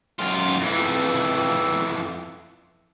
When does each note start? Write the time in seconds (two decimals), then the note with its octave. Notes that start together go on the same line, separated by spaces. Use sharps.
0.19 F#2 F4
0.62 F2 E3